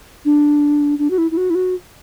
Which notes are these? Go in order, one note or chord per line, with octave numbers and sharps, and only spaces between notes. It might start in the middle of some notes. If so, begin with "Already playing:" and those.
D4
D4
F#4
E4
E4
F#4
E4
F#4